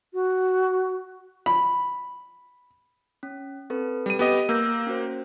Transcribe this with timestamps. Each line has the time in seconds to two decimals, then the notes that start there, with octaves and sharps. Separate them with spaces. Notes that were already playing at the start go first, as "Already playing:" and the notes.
0.14 F#4
1.46 B5
3.23 C#4
3.70 C4 A4 B4
4.06 G3 D#7
4.19 B3 G4 D#5
4.49 A#3 E6 G6 A#6
4.87 C#4 F#4 C5